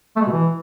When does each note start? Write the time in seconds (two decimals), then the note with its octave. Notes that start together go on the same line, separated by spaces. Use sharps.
0.16 A3
0.21 G#3
0.27 B2
0.32 E3